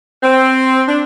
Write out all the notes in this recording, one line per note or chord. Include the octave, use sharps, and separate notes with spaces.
C4
D4